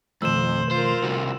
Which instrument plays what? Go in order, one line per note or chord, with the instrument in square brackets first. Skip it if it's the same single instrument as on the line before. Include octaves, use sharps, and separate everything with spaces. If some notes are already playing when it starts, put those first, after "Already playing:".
[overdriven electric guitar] F2 [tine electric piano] B2 D#3 A3 [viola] C5 [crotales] E6 E7
[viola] F4 A#4 [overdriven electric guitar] C5
[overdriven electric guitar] C2 F#4